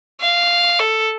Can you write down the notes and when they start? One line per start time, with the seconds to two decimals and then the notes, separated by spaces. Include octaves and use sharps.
0.21 F5
0.79 A4